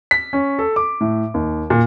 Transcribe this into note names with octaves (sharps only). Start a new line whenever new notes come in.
B6
C#4
A4
D6
A2
D#2
A#2